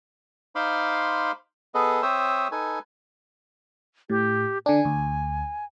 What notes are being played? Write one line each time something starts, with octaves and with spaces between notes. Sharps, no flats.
D#4 C5 F5 B5 C6 D6
B3 G#4 A4 B4 D#5
C4 C5 C#5 E5 D#6 E6
D#4 A4 B4 G#5
A2 G4
D3 D4 G#5
D2